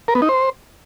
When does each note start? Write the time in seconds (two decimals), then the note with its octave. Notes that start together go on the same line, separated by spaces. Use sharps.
0.08 A#4
0.15 B3
0.22 D#4
0.29 C5